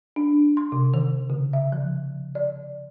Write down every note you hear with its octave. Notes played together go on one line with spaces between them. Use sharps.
D4
C6
C3
D#3
C#3
E5
F3
D5